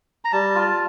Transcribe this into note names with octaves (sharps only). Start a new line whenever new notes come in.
A#5
G3 A5
F4